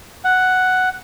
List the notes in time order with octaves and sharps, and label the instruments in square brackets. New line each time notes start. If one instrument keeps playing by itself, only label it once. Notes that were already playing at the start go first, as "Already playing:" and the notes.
[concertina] F#5